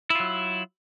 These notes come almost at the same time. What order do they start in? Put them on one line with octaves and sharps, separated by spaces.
E4 F4 F#3